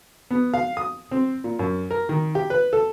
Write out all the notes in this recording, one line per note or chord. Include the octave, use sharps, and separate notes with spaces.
B3
F5
D#6
C4
A#2
F#2
A#4
D#3
G4
B4
A4